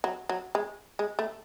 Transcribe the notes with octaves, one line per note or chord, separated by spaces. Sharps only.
F#3
F#3
G#3
G#3
A3